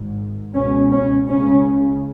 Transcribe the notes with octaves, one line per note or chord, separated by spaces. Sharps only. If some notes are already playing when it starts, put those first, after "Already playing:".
Already playing: G#1 G#2
C#2 B2 C#4
C#4
C#2 C#3 C#4